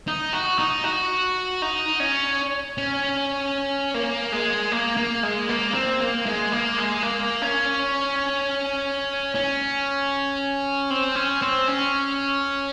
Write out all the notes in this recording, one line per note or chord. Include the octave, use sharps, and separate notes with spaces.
D#4
F#4
D#4
F#4
D#4
C#4
C#4
A#3
G#3
A#3
A#3
G#3
A#3
C4
A#3
G#3
A#3
G#3
A#3
C#4
C#4
C4
C#4
C4
C#4